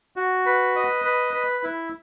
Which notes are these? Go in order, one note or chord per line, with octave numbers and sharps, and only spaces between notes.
F#4
B4
D#5
B4
B4
E4